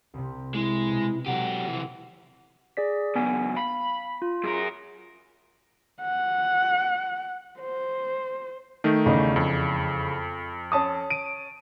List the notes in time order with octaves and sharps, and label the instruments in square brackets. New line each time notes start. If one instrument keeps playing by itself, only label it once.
[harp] C2 C3
[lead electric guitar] G#3 [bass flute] E4
[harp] B2
[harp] C3 A4 [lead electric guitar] F#3 G4 [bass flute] F#5
[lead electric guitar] E3 F3
[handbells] G#4 D5 B6
[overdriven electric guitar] C#2 F#2 [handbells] B3 G#5 B6
[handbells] F5 [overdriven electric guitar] B5
[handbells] F4
[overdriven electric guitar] F#2 A#4 [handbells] G#4
[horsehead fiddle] F#5
C5
[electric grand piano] D#3 A3 D#4
[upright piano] E2 C#3 D#5
[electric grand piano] F2
[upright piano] C#4 A5 D#6
[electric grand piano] D7 D#7